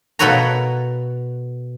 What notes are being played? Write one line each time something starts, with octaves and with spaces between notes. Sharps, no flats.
B2 B3 A4 B4 C#5 A#5